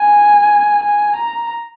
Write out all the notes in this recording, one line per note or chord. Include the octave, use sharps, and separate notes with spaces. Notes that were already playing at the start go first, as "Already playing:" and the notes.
Already playing: G#5
G#5
A#5